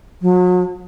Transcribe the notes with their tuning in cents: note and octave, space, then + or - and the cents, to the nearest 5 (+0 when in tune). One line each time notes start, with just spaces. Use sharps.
F#3 -40